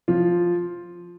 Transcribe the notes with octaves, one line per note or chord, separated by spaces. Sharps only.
F3 F4